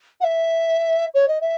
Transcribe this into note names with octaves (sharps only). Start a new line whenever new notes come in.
F#5
E5
C#5
D#5
E5